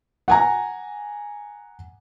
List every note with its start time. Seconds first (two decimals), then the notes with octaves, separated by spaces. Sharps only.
0.28 F#5 G#5 A#5